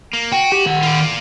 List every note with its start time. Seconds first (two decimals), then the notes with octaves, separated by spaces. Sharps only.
0.13 A#3
0.32 F#4 G5
0.52 G4
0.66 D#3 F#5
0.83 F4 D5